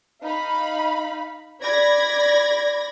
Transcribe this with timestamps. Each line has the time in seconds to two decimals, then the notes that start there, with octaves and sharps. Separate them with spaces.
0.23 D#4 F5 B5
1.61 D5 B5 G#6 A#6